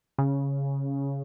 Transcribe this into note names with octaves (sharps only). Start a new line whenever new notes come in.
C#3